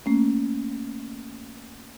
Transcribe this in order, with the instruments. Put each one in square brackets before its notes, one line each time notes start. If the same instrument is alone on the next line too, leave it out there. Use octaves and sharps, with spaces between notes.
[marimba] A3 A#3 C#4